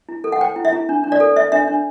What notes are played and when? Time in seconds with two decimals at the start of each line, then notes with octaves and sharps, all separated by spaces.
0.09 E4
0.24 A4
0.32 F#5
0.41 C5 G5
0.56 E4
0.65 E5
0.72 E4
0.89 D4
1.04 D4
1.12 D5
1.20 A4
1.36 C5 E5
1.52 D4 E5
1.67 D4